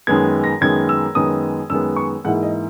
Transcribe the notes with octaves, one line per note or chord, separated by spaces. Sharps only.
F#2 D#3 G#3 B3 G#6
A#6
F#2 D#3 G#3 B3 G#6
E6
F#2 D#3 G#3 B3 D#6
F#2 D#3 G#3 B3 E6
C#6
G#2 E3 A#3 E4 F#5
D#5